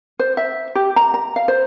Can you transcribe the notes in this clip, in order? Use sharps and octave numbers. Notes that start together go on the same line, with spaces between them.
C5
E5
G4
A#5
A#5
F5
C5